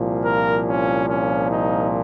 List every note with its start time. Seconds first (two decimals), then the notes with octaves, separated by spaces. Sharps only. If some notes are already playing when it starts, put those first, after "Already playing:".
Already playing: C2 A#2 F3
0.24 A#4
0.67 C#4
1.09 C#4
1.52 D#4